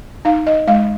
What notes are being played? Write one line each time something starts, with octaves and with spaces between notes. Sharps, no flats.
D#4 F5
D#5
G#3 F5